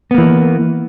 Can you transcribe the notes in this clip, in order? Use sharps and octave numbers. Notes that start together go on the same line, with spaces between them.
E3 A#3 B3